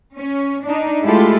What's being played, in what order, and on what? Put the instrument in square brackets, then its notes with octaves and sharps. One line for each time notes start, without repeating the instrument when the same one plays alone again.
[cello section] C#4
D4 D#4
G#3 A3 E4 F4 G4 A4